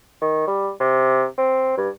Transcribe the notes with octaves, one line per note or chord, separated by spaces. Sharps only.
D#3
G3
C3
C4
G2